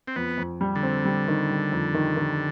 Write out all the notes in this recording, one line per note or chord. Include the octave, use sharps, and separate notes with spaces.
C4
F2 B3
F2
G3
D3
C4
G3
D#3
G3
F2
D#3
D#3